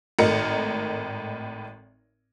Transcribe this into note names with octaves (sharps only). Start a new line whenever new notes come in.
G#1 A2 D#4 A#4 C#7